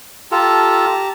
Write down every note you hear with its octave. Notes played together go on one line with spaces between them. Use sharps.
F4 G4 A4 A5 A#5